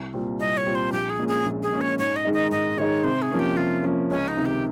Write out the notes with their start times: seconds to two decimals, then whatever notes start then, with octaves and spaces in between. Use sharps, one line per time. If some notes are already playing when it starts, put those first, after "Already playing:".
Already playing: C2
0.14 A#2 G3 C4 F4
0.40 C2 D#5
0.57 C#5
0.66 A#2 G3 C4 F4
0.75 C5
0.92 A#1 G4
1.10 G#4
1.19 A#2 G#3 C#4
1.28 G#4
1.46 A#1
1.63 G#4
1.72 A#2 G#3 C#4
1.81 C#5
1.99 G#2 C#5
2.16 D#5
2.25 D#3 G#3 D#4
2.34 D#5
2.51 G#2 D#5
2.77 D#3 G#3 D#4 C#5
3.04 C3 C5
3.22 G#4
3.31 F3 A#3 C#4
3.39 G4
3.57 C3 F4
3.83 F3 A#3 C#4
4.10 C#2 C#4
4.28 D#4
4.37 C3 D#3
4.46 G4